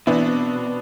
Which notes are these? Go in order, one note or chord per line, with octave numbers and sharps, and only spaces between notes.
B2 E3 B3 C4 D4